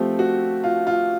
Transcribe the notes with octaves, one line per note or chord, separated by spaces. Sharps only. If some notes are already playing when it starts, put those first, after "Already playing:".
Already playing: F3 A3 C4 G4
F#4
F4
F4